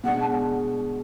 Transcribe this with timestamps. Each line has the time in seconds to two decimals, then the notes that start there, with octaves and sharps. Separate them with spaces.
0.03 B2 G#3 D4 F#5
0.20 A5
0.25 G#5